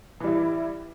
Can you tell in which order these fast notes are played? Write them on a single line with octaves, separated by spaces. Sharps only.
E3 G3 E4